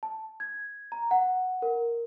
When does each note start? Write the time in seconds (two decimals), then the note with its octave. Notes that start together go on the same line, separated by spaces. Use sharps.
0.03 A5
0.40 G#6
0.92 A#5
1.11 F#5
1.62 A#4